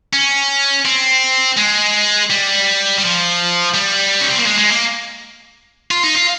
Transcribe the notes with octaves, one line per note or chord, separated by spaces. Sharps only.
C#4
C4
G#3
G3
G3
F3
G3
C#4
C4
A#3
G#3
G#3
A#3
F4
D#4
F4